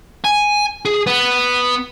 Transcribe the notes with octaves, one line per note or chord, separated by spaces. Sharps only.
G#5
G#4
B3